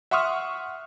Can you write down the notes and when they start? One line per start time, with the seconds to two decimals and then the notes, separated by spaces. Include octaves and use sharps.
0.11 E5 F#5 C6 C#6 D#6 F6